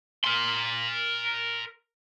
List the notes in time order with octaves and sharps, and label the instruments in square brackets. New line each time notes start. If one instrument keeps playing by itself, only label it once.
[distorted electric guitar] A#4 C6